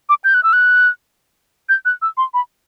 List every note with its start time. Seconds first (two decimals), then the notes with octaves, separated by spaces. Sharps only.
0.09 D6
0.24 G6
0.34 F#6
0.43 E6
0.53 F#6
1.69 G6
1.85 F#6
2.02 E6
2.17 C6
2.34 B5